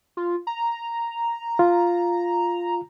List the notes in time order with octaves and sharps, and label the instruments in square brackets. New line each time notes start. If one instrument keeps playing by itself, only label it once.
[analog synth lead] F4
A#5
[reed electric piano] F4